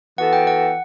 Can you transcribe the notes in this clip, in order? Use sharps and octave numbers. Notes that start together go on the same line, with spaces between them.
E3 B3 F#4 A4 F#5
G5
F#5